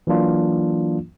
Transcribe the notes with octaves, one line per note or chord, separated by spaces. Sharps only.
E3 F#3 A#3 D4 F4